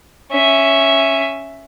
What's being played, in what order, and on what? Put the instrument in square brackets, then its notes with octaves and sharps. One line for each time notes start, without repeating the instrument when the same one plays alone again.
[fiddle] C#4 E5